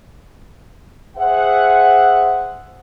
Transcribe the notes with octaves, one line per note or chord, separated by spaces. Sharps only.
G#4 C5 E5 F#5